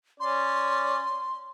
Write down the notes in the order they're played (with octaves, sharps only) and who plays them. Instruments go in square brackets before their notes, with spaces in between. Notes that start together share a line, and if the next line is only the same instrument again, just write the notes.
[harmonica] C#4 D5 [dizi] C6